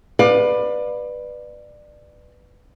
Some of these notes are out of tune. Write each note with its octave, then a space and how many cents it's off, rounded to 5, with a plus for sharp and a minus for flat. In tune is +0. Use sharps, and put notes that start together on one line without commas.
B4 +0 D5 +25 F5 +35